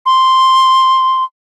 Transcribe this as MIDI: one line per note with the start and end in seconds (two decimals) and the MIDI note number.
0.06 1.24 84